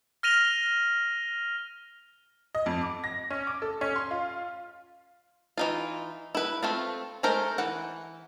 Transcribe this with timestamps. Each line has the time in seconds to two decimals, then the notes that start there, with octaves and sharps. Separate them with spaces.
0.23 F6 A#6 D#7 F7 G7
2.55 D#5
2.66 F2
2.81 D6
3.04 A#6
3.30 C#4
3.47 D6
3.62 A4
3.81 C#4
3.96 C6
4.11 F4
5.58 E3 D#4 F4
6.35 E4 B4
6.63 A3 C4 F4
7.23 G#3 A3 A#4 C5
7.58 E3 F#5